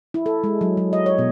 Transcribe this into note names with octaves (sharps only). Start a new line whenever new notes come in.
E4
A4
G#3
F#3
F#3
D#5
C#5
B2